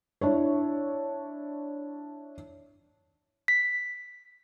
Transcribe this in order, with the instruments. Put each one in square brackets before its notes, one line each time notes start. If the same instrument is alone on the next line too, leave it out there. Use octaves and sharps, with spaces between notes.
[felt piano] D4 E4 C#5
[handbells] B6